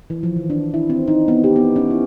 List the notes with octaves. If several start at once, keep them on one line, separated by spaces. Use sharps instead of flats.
E3
F3
D#3
D4
E4
C4
D#4
B3
G4
B3
C#4
E4